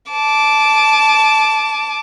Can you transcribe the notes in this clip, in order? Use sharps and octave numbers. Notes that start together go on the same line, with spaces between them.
A5 D6